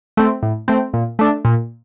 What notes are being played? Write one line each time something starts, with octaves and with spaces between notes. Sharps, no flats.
A3 C4
A2
A3 C4
A#2
A3 D4
A#2